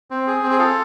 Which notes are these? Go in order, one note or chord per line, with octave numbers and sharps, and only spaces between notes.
C4
G#4
C4
G#4
F4 A4